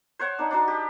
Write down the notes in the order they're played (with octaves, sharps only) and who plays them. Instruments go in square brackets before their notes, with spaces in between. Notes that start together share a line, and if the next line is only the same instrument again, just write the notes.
[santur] C5 C#5 F#5
D4 D#4 B4
D4 D#4 F#4
G4